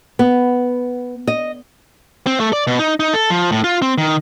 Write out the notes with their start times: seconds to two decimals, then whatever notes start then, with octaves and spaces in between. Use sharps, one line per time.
0.19 B3
1.27 D#5
2.27 C4
2.40 A3
2.53 D5
2.67 B2
2.79 D#4
3.00 D#4
3.13 A4
3.30 F3
3.52 A2
3.64 F4
3.82 C4
3.98 D#3